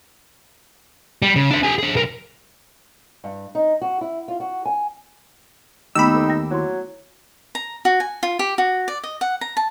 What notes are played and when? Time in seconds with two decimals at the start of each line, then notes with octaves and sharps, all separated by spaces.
1.22 G3
1.36 C#3
1.51 D4 E5
1.63 G4 G#5
1.78 D4 G#4
1.94 B1 A#4
3.24 G2
3.55 D#4
3.82 F#4
4.01 E4
4.28 F4
4.40 F#4
4.66 G#5
5.95 D#2 A3 B3 D#4 G4 B5 E6
6.14 A4 C5
6.28 G5 A#6
6.51 F#3 E4 C5 C6
7.55 A#5
7.85 F#4
8.00 G#5
8.23 F4
8.39 G4
8.58 F#4
8.88 D5
9.04 D#5
9.21 F#5
9.41 A#5
9.57 A5